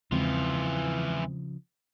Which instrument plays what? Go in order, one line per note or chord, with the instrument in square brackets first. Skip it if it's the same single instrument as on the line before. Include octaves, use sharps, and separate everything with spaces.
[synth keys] E2 G#3 C4 [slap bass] C#3 F3 [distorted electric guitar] E3 F4